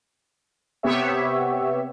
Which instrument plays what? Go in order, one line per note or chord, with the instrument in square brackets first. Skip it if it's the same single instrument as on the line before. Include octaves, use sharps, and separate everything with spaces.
[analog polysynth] C3 B3 G4 C#5 E5